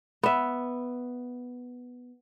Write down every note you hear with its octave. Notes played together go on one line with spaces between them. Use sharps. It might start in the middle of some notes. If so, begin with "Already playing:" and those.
B3 E5